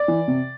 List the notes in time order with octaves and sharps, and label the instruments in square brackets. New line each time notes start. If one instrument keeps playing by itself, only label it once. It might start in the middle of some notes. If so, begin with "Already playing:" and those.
Already playing: [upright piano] D5
E3
C3